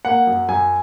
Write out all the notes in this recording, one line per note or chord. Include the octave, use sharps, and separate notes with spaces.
A#3 F#5
F#2
F#2 G#5